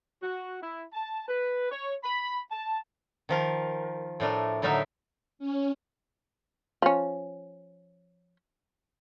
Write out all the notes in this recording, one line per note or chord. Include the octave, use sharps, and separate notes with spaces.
F#4
E4
A5
B4
C#5
B5
A5
D#3 F3 A#4
A2 A3 D4 A#4
A2 D3 F#3 D#4 A#4 E5
C#4
F3 C#4